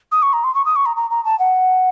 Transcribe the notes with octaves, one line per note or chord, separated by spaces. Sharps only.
D#6
C#6
A#5
C6
C#6
D#6
C#6
A#5
A#5
A#5
A5
F#5